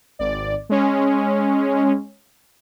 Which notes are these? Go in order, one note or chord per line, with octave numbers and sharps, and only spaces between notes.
G#1 D5
G#3 C#4